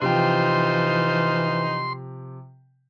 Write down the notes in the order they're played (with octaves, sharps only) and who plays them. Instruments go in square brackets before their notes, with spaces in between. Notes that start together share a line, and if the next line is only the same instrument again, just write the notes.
[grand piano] C3 F3 G5 [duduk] E3 [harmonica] D#4 F4 C5 [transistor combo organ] C6